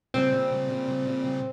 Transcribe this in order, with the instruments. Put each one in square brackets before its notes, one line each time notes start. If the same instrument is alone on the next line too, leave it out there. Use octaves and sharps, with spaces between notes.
[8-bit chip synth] A#2 C#3 G3 [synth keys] C4